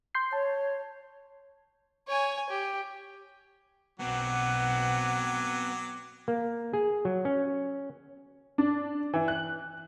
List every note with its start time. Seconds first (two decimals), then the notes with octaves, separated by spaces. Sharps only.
0.15 C6 G6 C7
0.33 C#5 A5
2.08 C#5 G#5
2.50 G4
4.00 B1 B2 F#3 B3 C4 F#5 D6
6.28 A#3
6.73 G#4
7.05 F#3
7.25 C#4
8.58 D4
9.14 E3
9.28 F#6